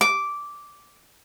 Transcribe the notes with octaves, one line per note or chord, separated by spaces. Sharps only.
D6